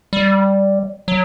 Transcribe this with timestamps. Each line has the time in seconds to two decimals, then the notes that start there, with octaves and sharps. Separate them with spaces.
0.13 G3
1.08 F#3